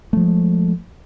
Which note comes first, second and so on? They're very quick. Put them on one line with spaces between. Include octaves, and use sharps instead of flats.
A3 F3 G#3